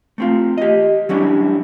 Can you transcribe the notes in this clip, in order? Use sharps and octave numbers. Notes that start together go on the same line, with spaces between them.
A3 C4 F4
G4 D#5
F#3 G3 C#4 D4 E4